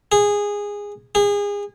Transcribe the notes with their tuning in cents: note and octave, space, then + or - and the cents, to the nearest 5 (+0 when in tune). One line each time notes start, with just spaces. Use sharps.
G#4 -15
G#4 -30